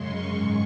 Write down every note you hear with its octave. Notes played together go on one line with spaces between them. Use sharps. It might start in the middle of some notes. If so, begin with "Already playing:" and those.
Already playing: F#2 C#3 G#3 C6 C#6
G#2 D#3 G#3